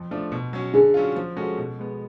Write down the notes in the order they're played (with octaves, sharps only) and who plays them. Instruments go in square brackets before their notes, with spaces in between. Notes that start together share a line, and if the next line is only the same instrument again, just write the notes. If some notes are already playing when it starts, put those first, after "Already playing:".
Already playing: [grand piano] F2
F3 A3 D4
B2
F#3 C#4
[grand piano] D3 [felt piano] G#4
[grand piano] F#3 C#4 F4
F3
G#3 C#4 F#4 A4
B2
G#3 B3